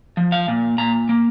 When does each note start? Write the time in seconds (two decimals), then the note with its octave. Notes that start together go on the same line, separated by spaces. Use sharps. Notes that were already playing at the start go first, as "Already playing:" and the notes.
0.17 F3
0.32 F5
0.48 A#2
0.78 A#2 A#5
1.09 A#3